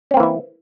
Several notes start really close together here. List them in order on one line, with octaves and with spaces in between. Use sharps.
C#4 C4 A#3 E3 E4